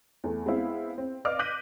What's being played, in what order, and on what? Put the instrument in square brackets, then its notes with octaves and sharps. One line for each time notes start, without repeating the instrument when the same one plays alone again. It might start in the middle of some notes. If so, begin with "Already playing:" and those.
[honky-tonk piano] E2 A3
G#3 B3 C4 E4 F5
C4
B4 D5 D#5 F5 D6 F6
D6 F#6 G6 A#6 B6 D#7